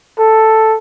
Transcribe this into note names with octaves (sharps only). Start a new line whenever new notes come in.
A4